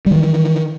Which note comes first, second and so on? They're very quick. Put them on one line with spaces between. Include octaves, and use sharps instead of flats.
G3 D#3 E3